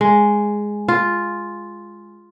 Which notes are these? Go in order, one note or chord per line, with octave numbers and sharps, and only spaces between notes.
G#3
F4